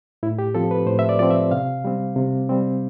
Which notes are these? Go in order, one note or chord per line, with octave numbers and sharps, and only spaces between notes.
A2 E4
G4
F3 C4 A4
B4
A2 C5
E5
D5
F3 C4 D5
E5
C3 F5
G3 C4
C3
G3 C4